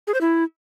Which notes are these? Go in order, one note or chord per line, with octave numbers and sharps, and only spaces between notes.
G#4
C5
E4